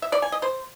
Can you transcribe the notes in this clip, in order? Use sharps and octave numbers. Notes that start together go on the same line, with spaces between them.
E5
D5
G#5
D#5
C5